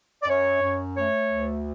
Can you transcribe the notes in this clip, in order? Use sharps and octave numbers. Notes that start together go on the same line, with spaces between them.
D5
F#2 C#5
F#2
A3 C#5
D2